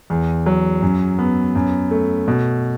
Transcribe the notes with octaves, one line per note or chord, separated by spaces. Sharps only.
E2
F#3
F#2
B3
F#2
A3
B2